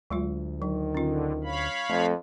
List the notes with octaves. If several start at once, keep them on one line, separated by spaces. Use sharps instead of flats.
D2 F#3 G#3 F4
D#3 F#3
D3 C#4 F4
C#5 F5 B5
F2 A3